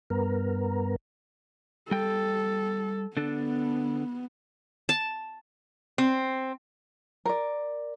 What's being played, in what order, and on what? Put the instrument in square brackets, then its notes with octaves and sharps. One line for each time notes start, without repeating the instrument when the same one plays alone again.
[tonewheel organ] G2 B3 A#4
[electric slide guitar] G3 G5 [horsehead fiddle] A4
[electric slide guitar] D3 D4 A4 [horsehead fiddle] B3
[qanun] A5
[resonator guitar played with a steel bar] C4
[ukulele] A#4 D5